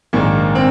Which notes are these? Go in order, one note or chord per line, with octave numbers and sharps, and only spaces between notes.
A#1 G#2 D#3 A#3
C4